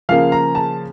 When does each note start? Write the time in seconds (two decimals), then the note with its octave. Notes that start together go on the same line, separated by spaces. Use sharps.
0.09 C#3 F3 A#3 F5
0.32 A#5
0.55 A5